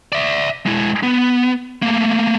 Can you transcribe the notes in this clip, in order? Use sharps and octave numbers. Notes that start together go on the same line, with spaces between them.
D5 E5
G#3 E4
B3
A3 A#3